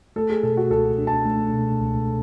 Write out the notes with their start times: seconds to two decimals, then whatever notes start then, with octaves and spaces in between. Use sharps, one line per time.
0.16 A3 A4
0.30 G#4
0.43 B2 A4
0.57 F#4
0.70 C#2 A4
0.98 D4
1.07 A5
1.26 A3
1.53 B2
1.81 C#2